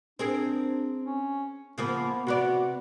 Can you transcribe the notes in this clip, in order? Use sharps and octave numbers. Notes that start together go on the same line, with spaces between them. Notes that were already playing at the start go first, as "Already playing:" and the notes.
C4 D4 G#4 A#4
C#4
C#3 F3 A#3 B3
C3 B3 F#4 D5